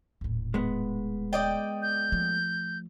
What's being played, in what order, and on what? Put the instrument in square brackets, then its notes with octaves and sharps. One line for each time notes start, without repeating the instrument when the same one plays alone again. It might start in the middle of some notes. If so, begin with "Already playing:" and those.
[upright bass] D#1 A2
[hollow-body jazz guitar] G#3 B3
[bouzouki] D5 D#5 G5
[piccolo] G6
[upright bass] F3 A3